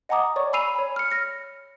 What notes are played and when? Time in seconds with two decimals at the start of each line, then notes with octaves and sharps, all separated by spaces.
0.09 D#5 F#5 G#5 A#5 D6 D#6
0.36 C#5 D5 C#6
0.53 G#5 B5 E6 C7 D#7 F7
0.76 C#5 B5
0.96 F6 C#7
1.10 F6 A#6 C#7